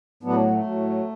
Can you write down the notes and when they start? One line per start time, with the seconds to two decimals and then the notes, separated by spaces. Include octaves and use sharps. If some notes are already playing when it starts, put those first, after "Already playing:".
0.23 A2 F#3 B3 D4
0.50 A3
0.64 A2 F#3